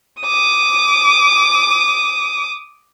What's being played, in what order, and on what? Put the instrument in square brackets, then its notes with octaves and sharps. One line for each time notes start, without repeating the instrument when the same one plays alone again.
[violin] D6 D#6